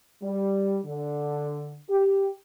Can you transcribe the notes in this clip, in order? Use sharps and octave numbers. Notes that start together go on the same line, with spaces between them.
G3
D3
G4